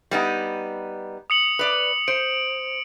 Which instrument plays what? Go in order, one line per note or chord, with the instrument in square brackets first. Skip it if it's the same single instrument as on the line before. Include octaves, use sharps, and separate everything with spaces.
[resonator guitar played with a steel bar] G3 B3 D#4
[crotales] D#6 C#7 F#7
[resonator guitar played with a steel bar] B4 D5
[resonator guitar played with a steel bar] C5 [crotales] D7